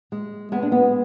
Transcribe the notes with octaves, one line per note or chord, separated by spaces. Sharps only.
G#3
G#3 B3
D4
B3